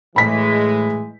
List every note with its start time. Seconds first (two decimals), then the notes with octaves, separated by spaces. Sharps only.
0.16 A2 E3 G#3 B5 B6